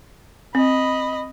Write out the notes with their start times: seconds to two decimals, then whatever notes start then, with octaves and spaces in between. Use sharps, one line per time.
0.55 C4 D#5 B5